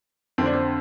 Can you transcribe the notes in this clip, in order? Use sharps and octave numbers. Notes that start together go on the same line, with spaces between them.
F2 D3 C4
D4
C4